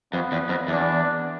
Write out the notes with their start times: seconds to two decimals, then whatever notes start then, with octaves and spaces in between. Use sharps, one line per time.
0.13 F2 B3
0.32 E2
0.49 F2
0.67 E2 D4